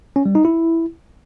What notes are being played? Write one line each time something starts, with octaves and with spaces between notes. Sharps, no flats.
C#4
G3
D#4
E4